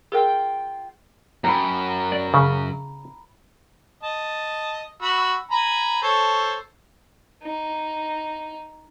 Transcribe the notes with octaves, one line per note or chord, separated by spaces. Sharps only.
F4 G#4 A#4 G5
F#2 A#5 B5
D5
C#3
D#5 A5
F#4 B5 E6
G#5 A#5 B5
A4 C5 C#5
D#4